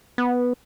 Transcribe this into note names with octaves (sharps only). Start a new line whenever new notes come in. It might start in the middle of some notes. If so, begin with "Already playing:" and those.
B3